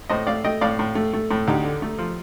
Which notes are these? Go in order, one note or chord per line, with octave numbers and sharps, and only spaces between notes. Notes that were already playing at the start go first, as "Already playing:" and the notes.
A2 C5 D#5
A3 D5 F5
A3 D#5 G5
A2 D5 F5
A2
A3
A3
A2
D2 D#4 G4
D3
A3
F3